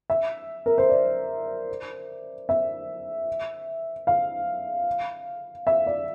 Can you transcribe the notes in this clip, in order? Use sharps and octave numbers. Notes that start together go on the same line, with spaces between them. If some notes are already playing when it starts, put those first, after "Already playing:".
E5
A#4
C5
D5
E5
F5
E5
D5